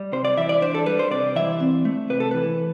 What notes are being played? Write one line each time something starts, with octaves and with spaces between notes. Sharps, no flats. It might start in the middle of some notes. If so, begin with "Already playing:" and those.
Already playing: G3
C3 C5
D5
E3 E5
D5
D4 C5
A4
G3 B4
C5
C3 D5
E3 E5
C4
A3
C3 B4
A4
E3 B4